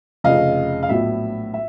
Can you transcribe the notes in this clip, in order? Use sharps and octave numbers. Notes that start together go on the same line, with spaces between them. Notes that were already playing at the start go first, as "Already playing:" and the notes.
F1 F2 C#3 D#5 F5
F5
A#1 A2 F#3 B3 E5
E5